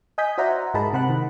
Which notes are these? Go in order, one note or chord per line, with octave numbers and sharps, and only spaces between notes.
D#5 G#5 D#6 G6 B6
F#4 C5 D5 E5 F#5 A#5
G#2 G#3 A#4 D#5 A5 B5
C3 C4 F#5 B5 F#6
D#3